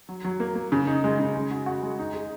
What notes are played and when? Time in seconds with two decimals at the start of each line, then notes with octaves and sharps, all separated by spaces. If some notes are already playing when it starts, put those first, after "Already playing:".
0.09 F#3
0.24 F#3
0.40 A#3
0.55 A#3
0.72 C#3
0.87 D#4
1.04 G#3
1.19 C#3
1.35 G#3
1.51 F#4
1.66 F#4
1.83 G#3
1.99 D#4
2.14 G#4